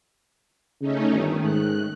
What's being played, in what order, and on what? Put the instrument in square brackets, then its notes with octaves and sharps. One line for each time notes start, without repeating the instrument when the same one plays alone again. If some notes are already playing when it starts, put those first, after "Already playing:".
[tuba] C#3 [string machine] A3 C#4 D#4
[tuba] G1 [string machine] D#3
[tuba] G#2 [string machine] F#6